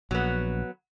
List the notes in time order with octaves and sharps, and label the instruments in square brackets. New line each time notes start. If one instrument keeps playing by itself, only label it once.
[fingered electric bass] A#1 [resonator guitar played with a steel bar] F#3 B3